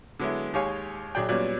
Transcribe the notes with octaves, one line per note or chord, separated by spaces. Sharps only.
D3 F#3 G#3 B3 E4
D#2 G#3 G4 C#5 F5 G#5
A#1 F#3 G#4 D5 G5
A#2 F#3 G3 B3 C#4 D5